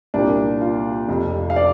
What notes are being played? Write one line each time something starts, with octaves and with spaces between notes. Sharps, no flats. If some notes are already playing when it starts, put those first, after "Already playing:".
C2 A#2 A#3 D4
F4
F1 F2 C3
F5
D5